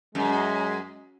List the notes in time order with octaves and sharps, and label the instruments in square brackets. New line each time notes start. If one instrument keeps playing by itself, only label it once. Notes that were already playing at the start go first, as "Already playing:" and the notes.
[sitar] F#2 [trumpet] G#3